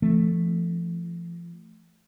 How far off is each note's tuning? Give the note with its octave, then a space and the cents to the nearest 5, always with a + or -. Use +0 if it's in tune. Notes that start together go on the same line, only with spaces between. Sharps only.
F3 -35 A3 +0 C4 +0